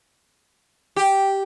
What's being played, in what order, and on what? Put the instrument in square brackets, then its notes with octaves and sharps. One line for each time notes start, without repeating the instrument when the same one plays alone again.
[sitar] G4